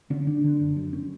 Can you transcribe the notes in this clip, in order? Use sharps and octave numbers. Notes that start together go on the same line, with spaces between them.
D3 C#4
D3 D4
D3
F#1
F#2
C#4